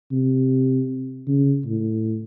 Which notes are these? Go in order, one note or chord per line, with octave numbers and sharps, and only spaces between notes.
C3
C#3
A2